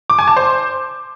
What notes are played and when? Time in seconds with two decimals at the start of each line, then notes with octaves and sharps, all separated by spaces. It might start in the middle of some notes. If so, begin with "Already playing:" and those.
0.10 D6
0.19 G#5
0.28 A5
0.37 C5